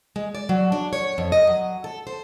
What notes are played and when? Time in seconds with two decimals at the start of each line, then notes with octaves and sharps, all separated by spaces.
0.16 G#3
0.35 D5
0.49 F#3
0.72 D4
0.93 C#5
1.18 F2
1.32 D#5
1.47 F#3
1.84 A4
2.07 C5